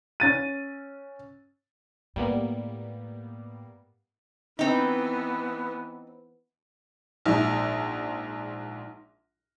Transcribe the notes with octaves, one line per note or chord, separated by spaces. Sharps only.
C#4 A6 D#7
A2 G3 A#3 B3
E3 B3 C4 D#4
A#1 G#2